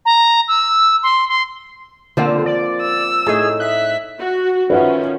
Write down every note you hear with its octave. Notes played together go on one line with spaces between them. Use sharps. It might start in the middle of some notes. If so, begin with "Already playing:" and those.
A#5
E6
C6
C6
D3 F3 A#3 C4
D5
E6
A2 D#4 G#4
E5 F#6 B6
F#4
D#3 F3 C#4 B4 E5 F#5